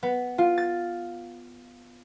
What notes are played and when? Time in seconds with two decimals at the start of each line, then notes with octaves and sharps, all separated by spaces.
0.03 B3
0.38 F4
0.58 A6